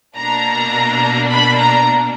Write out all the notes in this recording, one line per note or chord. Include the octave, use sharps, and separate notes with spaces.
B2 A#3 D4 A#5
B5
A#5